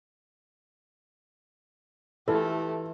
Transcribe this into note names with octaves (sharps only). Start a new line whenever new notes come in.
E3 A3 F4 G4 A4